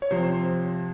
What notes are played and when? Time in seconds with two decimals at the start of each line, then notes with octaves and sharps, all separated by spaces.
0.02 C#5
0.11 C3 F3 C5